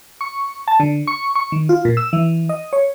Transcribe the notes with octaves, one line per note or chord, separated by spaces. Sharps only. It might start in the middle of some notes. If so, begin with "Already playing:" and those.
C#6
A5
D3
C#6
C#6
D#3
F4
A#2
E6
E3
D#5
C#5